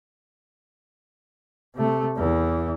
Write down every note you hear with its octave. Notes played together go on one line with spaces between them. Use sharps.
C3 A3
E2 E3